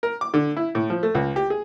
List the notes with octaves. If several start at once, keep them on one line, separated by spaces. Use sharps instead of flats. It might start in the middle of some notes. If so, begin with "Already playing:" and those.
A#4
D6
D3
E4
A2
F3
A3
C#2
G4
G#4